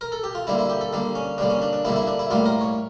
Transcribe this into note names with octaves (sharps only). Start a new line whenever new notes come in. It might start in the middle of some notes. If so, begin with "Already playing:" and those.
A#4
A4
G4
F4
D3 G3 A#3 E4
E4
G4
A4
D3 G3 A#3
C#4
D3 G3 A#3 D4
C#4
D4
D4
D3 G3 A#3 E4
E4
D4
E4
A2 G3 A#3 F4
A#4
C#5